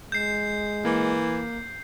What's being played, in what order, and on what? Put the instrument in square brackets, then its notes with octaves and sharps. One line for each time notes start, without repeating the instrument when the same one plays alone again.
[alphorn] G#3 [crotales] G6 C7
[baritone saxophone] E3 [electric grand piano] A#3